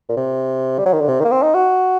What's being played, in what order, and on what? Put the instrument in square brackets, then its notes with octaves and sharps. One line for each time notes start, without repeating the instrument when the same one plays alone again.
[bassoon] A#2
C3
G3
F#3
D#3
D3
C3
D#3
A#3
C4
D#4
F#4